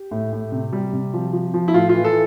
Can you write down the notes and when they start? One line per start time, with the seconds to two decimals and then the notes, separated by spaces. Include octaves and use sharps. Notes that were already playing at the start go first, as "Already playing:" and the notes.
Already playing: G4
0.11 A2
0.33 A2
0.52 C3
0.73 G3
0.93 C3
1.14 F3
1.33 F3
1.54 F3
1.68 E4
1.74 A2 F4
1.89 F4
1.95 E3
2.05 A4